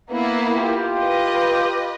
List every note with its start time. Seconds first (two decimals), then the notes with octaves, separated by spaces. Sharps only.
0.10 A#3 B3 E4
0.56 F4 G4 G5
0.98 B4 D#5